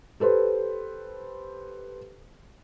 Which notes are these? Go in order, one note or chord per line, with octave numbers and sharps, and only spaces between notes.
G4 A4 B4 C5